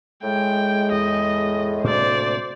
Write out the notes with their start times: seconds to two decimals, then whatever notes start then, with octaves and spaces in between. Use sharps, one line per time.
0.23 A2 G#3 G5
0.92 E2 D#5
1.84 D2 A2 C3 A#3 C5 D5